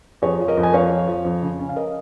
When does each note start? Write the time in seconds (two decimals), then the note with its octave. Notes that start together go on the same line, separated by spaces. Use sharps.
0.22 F2 G#4 C#5
0.40 F3
0.48 A#4 D#5
0.57 F2
0.63 G#5
0.73 F2 C#5 F5
0.91 F2
1.07 F3
1.25 F2
1.42 C#3
1.59 C#4
1.69 F5
1.76 A#4 D#5